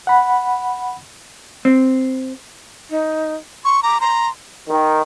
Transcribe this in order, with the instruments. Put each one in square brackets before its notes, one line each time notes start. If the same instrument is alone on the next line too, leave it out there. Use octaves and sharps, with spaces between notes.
[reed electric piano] F#5 B5
[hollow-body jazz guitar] C4
[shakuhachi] D#4
[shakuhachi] C6 [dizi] C#6
[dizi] A#5 [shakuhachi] D6
[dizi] A#5 [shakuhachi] C6
[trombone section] D#3